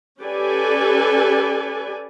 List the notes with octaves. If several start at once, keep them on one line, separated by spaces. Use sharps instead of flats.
C#4 G4 A4 B4 D5 G#5